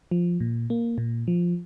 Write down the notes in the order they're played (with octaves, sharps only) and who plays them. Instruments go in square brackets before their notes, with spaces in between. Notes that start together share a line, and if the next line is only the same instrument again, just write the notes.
[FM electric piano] F3
A#2
A#3
A#2
F3